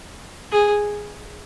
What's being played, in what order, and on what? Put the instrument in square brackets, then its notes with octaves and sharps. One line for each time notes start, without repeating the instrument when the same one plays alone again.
[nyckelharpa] G#4